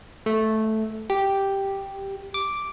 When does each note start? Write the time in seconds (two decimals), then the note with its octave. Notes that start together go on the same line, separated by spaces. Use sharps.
0.26 A3
1.10 G4
2.34 D6